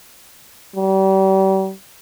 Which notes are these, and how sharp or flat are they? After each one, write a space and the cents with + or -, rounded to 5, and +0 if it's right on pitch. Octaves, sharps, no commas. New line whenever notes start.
G3 -35